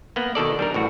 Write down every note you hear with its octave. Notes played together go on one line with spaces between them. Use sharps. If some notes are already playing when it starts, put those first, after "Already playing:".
A#3 B3
B2 D#3 A4 D5
G3 D4 A#4
A1 A2 F#4